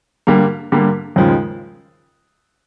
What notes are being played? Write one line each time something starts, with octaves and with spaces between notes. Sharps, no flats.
D3 G3 A#3
D3 G3 A#3
D#2 C#3 F3 G#3